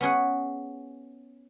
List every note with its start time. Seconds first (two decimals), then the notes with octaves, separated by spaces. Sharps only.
0.01 B3 C#4 G#4 F#5